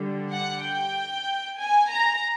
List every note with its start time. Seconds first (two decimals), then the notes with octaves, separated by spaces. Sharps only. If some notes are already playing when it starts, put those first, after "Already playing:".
Already playing: D3 G3
0.32 F#5
0.64 G5
1.59 G#5
1.91 A#5